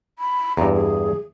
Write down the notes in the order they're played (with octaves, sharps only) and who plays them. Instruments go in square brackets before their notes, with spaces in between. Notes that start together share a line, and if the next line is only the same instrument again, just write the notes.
[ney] B5
[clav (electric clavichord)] E2 G2 [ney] A#5
[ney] G#4